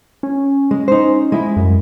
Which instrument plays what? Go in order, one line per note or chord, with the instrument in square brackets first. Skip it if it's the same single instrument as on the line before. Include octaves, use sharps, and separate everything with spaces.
[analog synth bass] C#4
[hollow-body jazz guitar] G#3
D#4 C5
G#3 E4
[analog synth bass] F#2